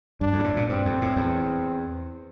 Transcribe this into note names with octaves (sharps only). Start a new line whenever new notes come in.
G2 D4
F2
G2
A2
A#2
G2 C4
F2
A2
E2